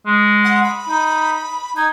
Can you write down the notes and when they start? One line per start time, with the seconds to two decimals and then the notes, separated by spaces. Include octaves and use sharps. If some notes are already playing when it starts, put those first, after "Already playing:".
0.06 G#3
0.45 F#5
0.64 B5
0.89 D#4
1.77 D#4 G#6